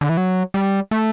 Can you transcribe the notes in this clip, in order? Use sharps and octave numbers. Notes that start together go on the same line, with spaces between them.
D3
E3
F#3
G3
A3